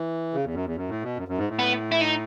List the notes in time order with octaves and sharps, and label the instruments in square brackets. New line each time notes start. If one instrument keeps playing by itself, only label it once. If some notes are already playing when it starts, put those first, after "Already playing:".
Already playing: [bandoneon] E3
C#3
E2
F#2
E2
F#2
A2
B2
F#2
F#2
G#2
A2
[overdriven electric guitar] B3
E4
D#4